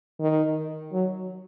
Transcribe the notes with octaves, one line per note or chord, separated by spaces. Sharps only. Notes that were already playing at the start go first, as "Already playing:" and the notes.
D#3
F#3